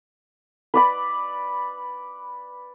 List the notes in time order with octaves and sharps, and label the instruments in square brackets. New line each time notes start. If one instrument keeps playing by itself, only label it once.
[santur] B4 D5 B5